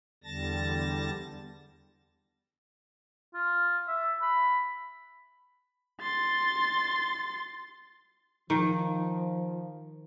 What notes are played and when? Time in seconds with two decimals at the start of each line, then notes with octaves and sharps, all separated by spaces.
0.24 E2 D3 G3 A5 A6 A#6
3.34 F4
3.88 E5
4.22 B5
6.01 C6 A6
8.50 D#3 F3